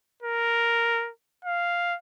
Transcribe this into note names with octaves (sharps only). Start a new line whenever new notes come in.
A#4
F5